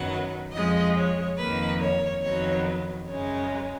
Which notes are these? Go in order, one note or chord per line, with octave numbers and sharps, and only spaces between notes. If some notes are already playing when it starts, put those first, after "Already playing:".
Already playing: F#2 D#3 F#3 B3 F#5
F2 F3 G#3 D#5
C#5
F2 D#3 A#3 B4
C#5
F2 D#3 F#3 B3 C#5
F#2 C#3 G#3 C#5